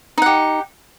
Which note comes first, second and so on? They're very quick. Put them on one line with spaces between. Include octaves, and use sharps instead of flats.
D#4 F#5 G4